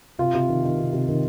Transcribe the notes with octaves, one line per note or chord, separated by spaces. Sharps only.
C3 F4
C3
D#3
D#3
C3
C3
D#3